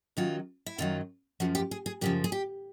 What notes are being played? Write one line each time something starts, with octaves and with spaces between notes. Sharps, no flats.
F#2 D#3 F#3 F4
E4
F#2 D#3 F#3 F4
F#2 C#3 F3 F#4
G4
G#4
G#4
F#2 C#3 F3 G4
G#4
G4